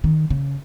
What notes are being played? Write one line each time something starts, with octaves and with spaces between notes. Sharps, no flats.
D#3
C#3